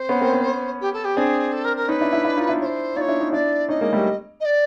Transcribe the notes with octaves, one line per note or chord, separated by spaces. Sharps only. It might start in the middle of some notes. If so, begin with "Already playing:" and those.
Already playing: C4 C5
B3 C#4
A#3 C4
B3 C#4
G4
A4
G4
C4 D4 G#4
A4
A#4
A#4
C#4 D#4 B4
D4 E4
D4 E4
D4 E4
D#4 F4
D4 E4
C#5
C5
D#4 F4 C#5 D5
D4 E4
C#4 D#4
D4 E4 D5
C#4 D#4 D#5
G#3 A#3
G3 A3
D#5
D5